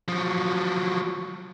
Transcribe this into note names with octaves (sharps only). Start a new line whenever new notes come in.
F3 F#3